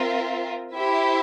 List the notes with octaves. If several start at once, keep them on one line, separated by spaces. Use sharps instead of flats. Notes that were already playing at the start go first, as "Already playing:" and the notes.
Already playing: C4 F4 A#4 E5
E4 G4 C5 E5